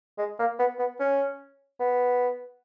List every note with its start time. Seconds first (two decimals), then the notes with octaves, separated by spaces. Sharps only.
0.18 G#3
0.39 A#3
0.59 B3
0.79 B3
1.00 C#4
1.80 B3